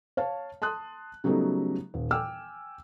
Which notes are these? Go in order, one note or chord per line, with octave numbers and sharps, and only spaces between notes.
C#5 F5 A5
A5 C6 D#6 F#6
C#3 F#3 G3 A3 B3 D#4
D#1
G5 G#5 D6 E6 F6